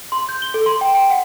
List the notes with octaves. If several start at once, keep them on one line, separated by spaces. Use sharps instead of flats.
C6
G6
G7
A4
C6
G5
G5
F#5